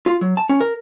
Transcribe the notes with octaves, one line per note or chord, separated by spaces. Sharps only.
F4
F#3
A5
C#4
A#4